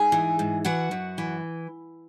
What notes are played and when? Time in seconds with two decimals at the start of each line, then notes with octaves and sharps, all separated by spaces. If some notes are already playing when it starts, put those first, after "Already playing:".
Already playing: G#2 G#4 G#5
0.12 E3
0.39 G#2
0.65 E3 F#4 F#5
0.91 F#2
1.18 E3